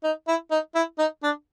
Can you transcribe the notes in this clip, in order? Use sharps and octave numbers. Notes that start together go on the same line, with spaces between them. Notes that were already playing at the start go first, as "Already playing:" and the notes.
D#4
E4
D#4
E4
D#4
D4